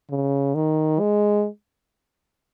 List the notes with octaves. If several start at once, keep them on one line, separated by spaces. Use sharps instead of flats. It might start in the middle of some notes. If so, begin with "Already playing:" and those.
C#3
D#3
G#3